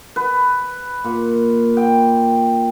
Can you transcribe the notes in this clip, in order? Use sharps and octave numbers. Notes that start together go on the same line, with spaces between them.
B4
A#2
G5